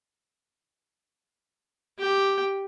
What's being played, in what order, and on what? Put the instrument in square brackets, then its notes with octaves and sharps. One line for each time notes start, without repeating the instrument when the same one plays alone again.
[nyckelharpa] G4 G5